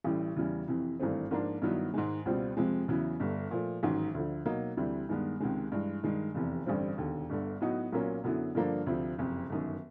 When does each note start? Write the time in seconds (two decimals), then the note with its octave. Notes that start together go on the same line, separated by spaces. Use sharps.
0.04 A1 A2 E3 G3
0.36 E2 C#3 E3 G3
0.68 F2 C3 E3
1.00 G#1 G2 E3 A3 C4
1.31 G#2 F3 A#3 D4 F4
1.62 G2 D#3 F#3 B3 E4
1.94 G#2 D#3 G#3
2.25 C#2 B2 G3 C4 F4
2.57 F2 C3 F3 G#3
2.88 E2 C#3 F#3 B3 E4
3.20 G1 G2 D3
3.51 A#2 F3 A3
3.83 A1 G#2 D#3 F#3
4.14 D2 D3 F3
4.46 B2 F#3 A#3 D#4
4.77 D2 C3 E3 G3
5.09 G2 D#3 G#3 B3
5.40 C#2 C3 D#3 G#3
5.72 G2 E3 G#3
6.03 G2 D#3 G#3
6.35 F1 E2 C3
6.66 A1 G2 D3 G3 C4
6.98 E1 D#2 D3
7.29 G1 G2 D3
7.61 A2 F#3 B3 D#4 F#4
7.92 B1 A#2 F#3 A#3 C#4
8.24 F#2 D3 F#3 B3 E4
8.55 G2 D3 F3 A#3 D4
8.86 D2 C3 F3
9.18 F#1 F2 C3
9.50 G1 F#2 D#3